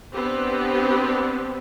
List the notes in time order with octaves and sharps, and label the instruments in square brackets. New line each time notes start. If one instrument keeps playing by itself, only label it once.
[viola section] B3 C4 D4 G4 B4 C5